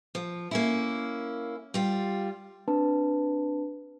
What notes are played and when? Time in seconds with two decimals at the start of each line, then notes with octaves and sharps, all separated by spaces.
0.15 F3
0.51 A#3 C#4 E4
1.74 G3 F4
2.68 C4 D4 B4 A5